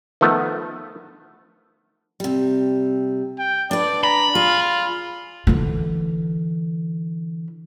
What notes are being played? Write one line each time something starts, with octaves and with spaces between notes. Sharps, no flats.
D#3 F3 A3 B3
C3 G3
G5
D4 B4 D5
A#5 B5
F4 G#4
D3 E3